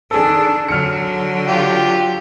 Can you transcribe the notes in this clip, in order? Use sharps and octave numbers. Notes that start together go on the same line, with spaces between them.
D#3 D4 G#4 A4
D3 F#3 F6 C#7
F4 G4